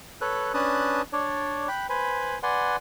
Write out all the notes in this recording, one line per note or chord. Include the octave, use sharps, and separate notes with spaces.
A4 B4 C#5 F#6
C#4 D4 B4 A5 D#6 F#6
D4 C#5 D5
G5 B5 F#6
B4 C5 G#5 B5
B4 D5 F#5 G#5 C6